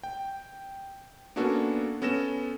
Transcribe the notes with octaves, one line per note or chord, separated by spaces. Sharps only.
G5
A#3 B3 C#4 D4 F#4 A4
B3 C#4 A4 A#6 E7